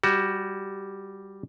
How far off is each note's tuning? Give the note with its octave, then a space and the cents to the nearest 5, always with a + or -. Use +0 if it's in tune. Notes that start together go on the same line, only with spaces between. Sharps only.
G3 +0 F#4 +15